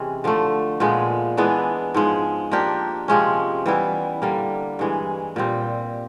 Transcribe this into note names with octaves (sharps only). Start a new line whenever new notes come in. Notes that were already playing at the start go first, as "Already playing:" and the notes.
Already playing: C3 E3 G#3 C#4
D3 F3 A3
A#2 F3 G#3 B3
E3 G#3 B3 D4
G#2 F3 G#3
F3 A#3 D4 G4
C3 F3 G#3 C#4
E3 G3 B3 E4
D3 G3 A#3
G2 E3 G#3
A#2 G3 C4